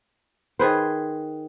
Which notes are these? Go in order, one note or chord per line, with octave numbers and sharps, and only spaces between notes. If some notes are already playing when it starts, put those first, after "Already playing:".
D#3 G#4 B4 C5